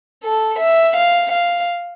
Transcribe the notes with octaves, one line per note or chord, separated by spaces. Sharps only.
A4
E5
F5
F5